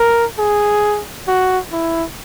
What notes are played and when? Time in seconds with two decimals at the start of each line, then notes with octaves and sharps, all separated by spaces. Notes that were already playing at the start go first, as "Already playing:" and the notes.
Already playing: A#4
0.39 G#4
1.28 F#4
1.72 E4